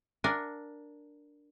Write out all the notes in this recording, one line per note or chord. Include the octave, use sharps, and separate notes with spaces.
D4 A#4 F#5 G#5